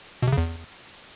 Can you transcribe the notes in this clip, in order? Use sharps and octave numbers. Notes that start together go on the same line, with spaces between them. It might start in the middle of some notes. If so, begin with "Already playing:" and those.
B2
C3
C#3
E2